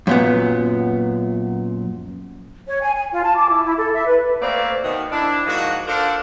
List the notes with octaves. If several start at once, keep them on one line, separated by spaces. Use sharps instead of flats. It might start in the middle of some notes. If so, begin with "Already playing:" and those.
F#2 A#2 B3
C#5
G#5
G#5
F4
A5
D6
E4
E4
A4
E5
B4
A3 A#3 C4 D5
B2 D#3 B3
D4 E4
G#2 F3 A#3 D#4 F#4
D4 F4 A4 A#4 C5 D5